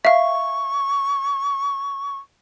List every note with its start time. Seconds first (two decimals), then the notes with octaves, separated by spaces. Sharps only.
0.05 E5 F5 C#6